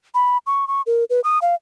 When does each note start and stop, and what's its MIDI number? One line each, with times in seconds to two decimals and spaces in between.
0.14 0.38 83
0.47 0.68 85
0.68 0.82 85
0.86 1.04 70
1.10 1.20 71
1.24 1.39 87
1.42 1.55 77